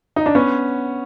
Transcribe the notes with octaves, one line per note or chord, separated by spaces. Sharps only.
D#4
D4
B3 C#4